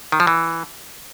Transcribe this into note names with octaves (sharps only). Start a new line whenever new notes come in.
D#3
F3
E3